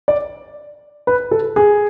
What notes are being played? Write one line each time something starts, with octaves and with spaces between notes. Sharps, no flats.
D5
B4
A4
G#4